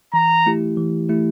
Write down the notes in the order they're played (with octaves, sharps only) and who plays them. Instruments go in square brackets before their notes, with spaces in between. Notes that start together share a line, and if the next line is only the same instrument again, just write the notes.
[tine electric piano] E3 [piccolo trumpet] A#5
[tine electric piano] A3 E4 G4
E3
A3 E4 G4